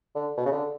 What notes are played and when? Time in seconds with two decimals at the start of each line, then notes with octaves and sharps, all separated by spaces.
0.15 D3
0.37 B2
0.46 C#3
0.52 D3